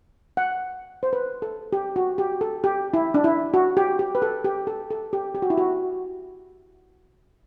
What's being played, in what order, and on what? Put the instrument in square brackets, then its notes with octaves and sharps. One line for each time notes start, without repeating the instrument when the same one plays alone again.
[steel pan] F#5
C5
B4
A4
G4
F#4
G4
A4
G4
E4
D4
E4
F#4
G4
G4
B4
A4
G4
A4
A4
G4
G4
F#4
E4
F#4